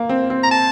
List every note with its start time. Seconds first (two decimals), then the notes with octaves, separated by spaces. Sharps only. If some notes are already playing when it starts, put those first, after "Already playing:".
Already playing: A#3
0.09 C4
0.30 C4
0.43 A#5
0.51 A5